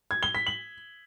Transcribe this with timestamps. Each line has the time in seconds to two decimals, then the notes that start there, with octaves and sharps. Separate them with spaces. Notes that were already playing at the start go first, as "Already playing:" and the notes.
0.11 G#6
0.23 G7
0.35 B6
0.46 F#7